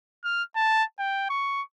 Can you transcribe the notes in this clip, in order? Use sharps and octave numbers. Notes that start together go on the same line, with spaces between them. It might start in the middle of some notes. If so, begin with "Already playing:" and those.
F6
A5
G5
C#6